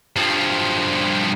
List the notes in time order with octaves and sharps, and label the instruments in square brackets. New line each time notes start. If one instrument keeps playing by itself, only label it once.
[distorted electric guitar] G2 F3